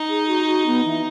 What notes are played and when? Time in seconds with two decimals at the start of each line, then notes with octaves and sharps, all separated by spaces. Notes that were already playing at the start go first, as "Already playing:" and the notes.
Already playing: D#4
0.09 G#4
0.28 F#4
0.47 F#4
0.66 B3
0.85 E3